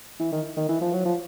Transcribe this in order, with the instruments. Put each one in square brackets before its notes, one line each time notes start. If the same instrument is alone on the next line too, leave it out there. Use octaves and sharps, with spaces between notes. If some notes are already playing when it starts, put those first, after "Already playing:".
[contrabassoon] E3
D#3
D#3
E3
F3
F#3
F3